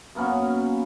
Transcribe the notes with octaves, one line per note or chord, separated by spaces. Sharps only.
F#2 A#3 B3 C#4